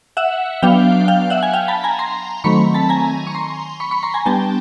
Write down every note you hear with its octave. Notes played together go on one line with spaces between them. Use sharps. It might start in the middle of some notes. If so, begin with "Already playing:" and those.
E5 F#5
F#3 B3 D4 F5 G5
F5 G5
E5 F#5
G#5
F5 G5
A5 B5
G#5 A#5
A#5 C6
D#3 F#3 A3 C4 B5 C#6
A5 B5
G#5 A#5
C#6
A#5 C6
B5 C#6
B5 C#6
A#5 C6
G#5 A#5
G3 B3 D4 G5 A5